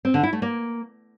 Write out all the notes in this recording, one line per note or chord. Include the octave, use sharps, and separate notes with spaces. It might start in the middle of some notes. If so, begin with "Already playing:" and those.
C4
D3
E4
A3
A#3